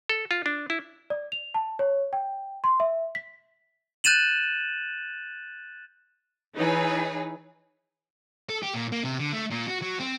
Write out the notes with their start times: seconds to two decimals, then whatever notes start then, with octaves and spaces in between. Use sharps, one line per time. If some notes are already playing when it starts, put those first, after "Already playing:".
0.09 A4
0.31 F4
0.46 D4
0.70 E4
1.10 D5
1.32 F7
1.54 A5
1.79 C#5
2.13 G5
2.64 C6
2.80 E5
3.15 B6
4.04 F#6 G6 A6 D#7 E7 F#7
6.56 E3 D#4 E4 G#4 B4 C#5
8.49 A4
8.63 G4
8.74 A#2
8.92 A#3
9.04 C3
9.19 D3
9.33 A3
9.50 A#2
9.67 F#4
9.81 F#3
9.99 C4